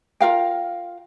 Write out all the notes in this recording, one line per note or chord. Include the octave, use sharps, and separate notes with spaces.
F4 A#4 F5 G5